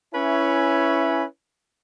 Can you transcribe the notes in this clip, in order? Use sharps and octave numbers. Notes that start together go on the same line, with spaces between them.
C#4 E4 B4 C#5 E5 G#5